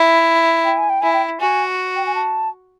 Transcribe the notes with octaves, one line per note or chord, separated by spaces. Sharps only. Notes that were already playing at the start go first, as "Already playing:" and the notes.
Already playing: E4
G5
G#5
G5
E4 G#5
G5
F#4 G#5
G5
G#5
A5